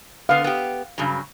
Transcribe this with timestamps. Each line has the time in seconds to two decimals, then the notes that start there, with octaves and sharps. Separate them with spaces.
0.29 D3 B3 F5
0.44 B3 G4
0.98 G2 C#3 F#3